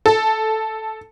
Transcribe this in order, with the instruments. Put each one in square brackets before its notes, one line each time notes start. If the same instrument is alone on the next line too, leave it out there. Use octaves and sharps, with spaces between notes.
[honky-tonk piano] A4